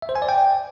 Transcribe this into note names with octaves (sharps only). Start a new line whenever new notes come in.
E5
C5
G#5
D5
G5